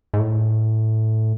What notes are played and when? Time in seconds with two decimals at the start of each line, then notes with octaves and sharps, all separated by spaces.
0.14 G#2
0.19 A2